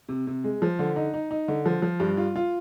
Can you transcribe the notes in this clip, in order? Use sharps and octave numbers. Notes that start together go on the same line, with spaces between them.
C3
C3
G#3
F3
D3
D#4
D#4
D#4
D3
F3
F3
G2
F4
F4